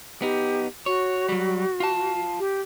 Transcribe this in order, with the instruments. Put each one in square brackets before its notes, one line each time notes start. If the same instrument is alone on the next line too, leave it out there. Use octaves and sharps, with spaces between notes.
[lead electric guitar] B3 D#4 [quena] G4
[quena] F#4 [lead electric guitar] C#5
[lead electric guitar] F#3 G3
F4 A5
[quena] G4